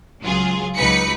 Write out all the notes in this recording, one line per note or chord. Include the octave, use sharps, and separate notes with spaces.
C#2 F#3 F4 G#4
C#2 F#3 D#4 B4 B6 C#7